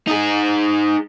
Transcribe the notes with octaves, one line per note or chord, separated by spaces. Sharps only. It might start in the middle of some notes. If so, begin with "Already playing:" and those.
D#4 G#4